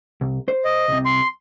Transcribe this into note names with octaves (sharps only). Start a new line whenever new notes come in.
C2
C5
D#5
C2 C3
C6